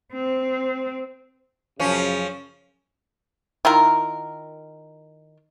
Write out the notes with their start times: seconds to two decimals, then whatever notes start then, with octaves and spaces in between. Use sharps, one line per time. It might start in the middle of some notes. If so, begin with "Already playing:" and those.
0.12 C4
1.80 F#2 C#3 F3 C#4
3.65 D#3 E4 F4 A#4